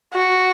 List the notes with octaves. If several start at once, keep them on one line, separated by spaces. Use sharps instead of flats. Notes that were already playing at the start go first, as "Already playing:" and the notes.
F#4